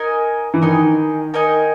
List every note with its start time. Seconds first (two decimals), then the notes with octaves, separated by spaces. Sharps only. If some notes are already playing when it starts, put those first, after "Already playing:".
Already playing: D#4 A#4 D#5 G#5
0.54 E3
0.62 D#3 D#4 A#4 D#5 G#5
1.34 D#4 A#4 D#5 G#5